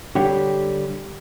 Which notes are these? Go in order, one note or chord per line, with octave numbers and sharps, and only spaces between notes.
D3 G3 G4 C#5